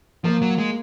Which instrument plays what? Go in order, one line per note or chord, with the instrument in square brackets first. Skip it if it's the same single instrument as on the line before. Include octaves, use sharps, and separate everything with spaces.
[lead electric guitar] F3 [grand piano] A#3
[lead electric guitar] F#3
G#3